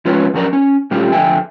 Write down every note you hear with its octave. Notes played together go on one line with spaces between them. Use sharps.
F3 G#3 C#4 F4 B4 C#5
F#2 F3 C#4 A#4 D5 A#5
C#4
A#2 G3 A3 C#4 F4 G4
F2 D3 E5 G5 G#5